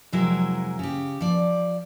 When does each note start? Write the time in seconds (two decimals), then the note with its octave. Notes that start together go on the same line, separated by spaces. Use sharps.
0.12 F2 C3 F#3 G#3 E4 A#4
0.79 C#3 G4
1.21 F3 D5